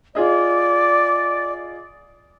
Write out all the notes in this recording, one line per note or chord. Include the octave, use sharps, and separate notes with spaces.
F4 G#4 D5 D#5